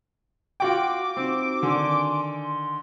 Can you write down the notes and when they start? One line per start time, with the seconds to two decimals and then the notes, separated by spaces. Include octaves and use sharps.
0.60 F4 F#4 G5 D6
1.17 C4 D#4 F#4
1.63 D3 D#3 G#5 C6
2.43 C6